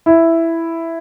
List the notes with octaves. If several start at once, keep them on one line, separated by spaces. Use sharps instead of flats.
E4